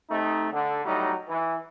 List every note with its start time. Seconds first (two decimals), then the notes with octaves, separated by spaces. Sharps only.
0.10 C3 A3 D#4
0.53 D3
0.85 A2 F#3 G3 D#4
1.29 E3